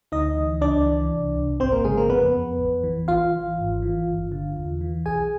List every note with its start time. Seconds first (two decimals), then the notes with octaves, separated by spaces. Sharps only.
0.12 D2 D#4 D#5
0.37 E3
0.61 C#2 D4 D5
0.87 E3
1.11 C2
1.36 C2
1.60 G#1 C4 C5
1.72 A#3 A#4
1.84 C#3 G#3 G#4
1.97 A#3 A#4
2.09 F2 B3 B4
2.34 F2
2.59 A1
2.83 E3
3.08 A1 F4 F5
3.33 E3
3.58 G#1
3.82 E3
4.07 G1
4.32 D3
4.57 E2
4.81 E3
5.05 B1 G#4 G#5